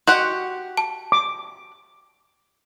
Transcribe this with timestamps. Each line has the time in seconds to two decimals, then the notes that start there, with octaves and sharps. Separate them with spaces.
0.07 F#4 G4 D#5 F#5 C6
0.77 A5
1.12 D6